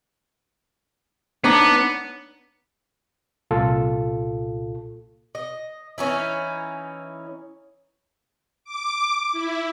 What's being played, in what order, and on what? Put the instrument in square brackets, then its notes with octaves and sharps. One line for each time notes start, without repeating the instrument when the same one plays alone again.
[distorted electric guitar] B3 [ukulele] D4 D#4 C#5
[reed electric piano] C2 A#2 F4 A4
[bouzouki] D#5
E3 C#4 D#4 E4
[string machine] D6
E4